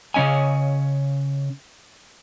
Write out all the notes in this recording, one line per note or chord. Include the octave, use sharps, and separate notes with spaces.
C#3 F3 C#4 D#5 G#5